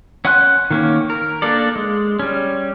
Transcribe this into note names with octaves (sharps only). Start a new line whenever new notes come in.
C#4 F#5 G#5 C6 F#6
D#3 A#3 C#4
A#4
A#3 D4 A4 D5
G#3
G3 C#4